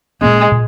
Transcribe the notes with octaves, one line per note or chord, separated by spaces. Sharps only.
A#2 G#3 A#3 C#4
A#2